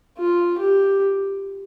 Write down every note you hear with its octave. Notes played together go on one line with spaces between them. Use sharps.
F4
G4